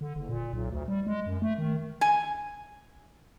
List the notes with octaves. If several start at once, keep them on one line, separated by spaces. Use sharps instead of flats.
D3
F#1
A#2
B1
D2
G3
G#3
F#2
A3
D#3
G#5